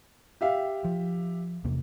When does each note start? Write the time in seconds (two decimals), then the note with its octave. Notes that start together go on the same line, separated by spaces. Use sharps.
0.41 G4 E5 F5
0.84 F3
1.64 E2 C3 A#3